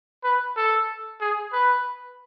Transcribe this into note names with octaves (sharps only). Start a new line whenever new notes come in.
B4
A4
G#4
B4